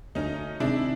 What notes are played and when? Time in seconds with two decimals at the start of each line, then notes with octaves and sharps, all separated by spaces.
0.15 D2 C#4 D#4
0.60 C3 D#3 G#3 D4 E4